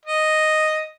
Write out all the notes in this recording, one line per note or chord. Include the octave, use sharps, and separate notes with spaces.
D#5